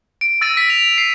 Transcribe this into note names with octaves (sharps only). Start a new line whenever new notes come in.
D7
E6 A6 A#6 D#7
E6 B6
F7
C7